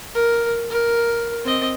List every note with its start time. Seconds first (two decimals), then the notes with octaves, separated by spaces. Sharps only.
0.15 A#4
0.70 A#4
1.44 C4 D#5